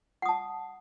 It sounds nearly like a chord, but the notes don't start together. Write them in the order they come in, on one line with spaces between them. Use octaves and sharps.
F#5 D#6 A5